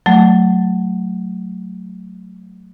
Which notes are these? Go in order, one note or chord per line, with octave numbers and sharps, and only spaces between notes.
F#3 A3